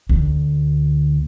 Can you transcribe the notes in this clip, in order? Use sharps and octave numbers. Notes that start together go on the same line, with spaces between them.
D2